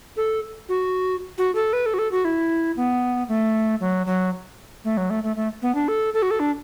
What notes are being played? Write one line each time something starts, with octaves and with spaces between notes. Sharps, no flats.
A4
F#4
F#4
A4
B4
A4
F#4
A4
F#4
E4
B3
A3
F#3
F#3
A3
F#3
A3
A3
A3
B3
D4
A4
A4
F#4
A4
D4